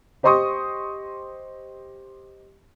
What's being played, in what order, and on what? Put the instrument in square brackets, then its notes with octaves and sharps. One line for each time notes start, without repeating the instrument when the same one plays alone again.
[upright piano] G4 C5 D#5 C6 C#6 D#6